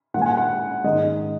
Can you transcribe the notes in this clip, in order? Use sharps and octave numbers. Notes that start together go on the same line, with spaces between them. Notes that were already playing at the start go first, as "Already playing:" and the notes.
A#2 G#3 F#5 G#5
F#5
F#5
G#2 D#3 G#3 D#5